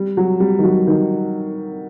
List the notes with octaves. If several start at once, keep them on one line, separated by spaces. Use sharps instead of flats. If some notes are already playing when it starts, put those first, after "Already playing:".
Already playing: G3
F#3
G3
D#3
F#3
D#3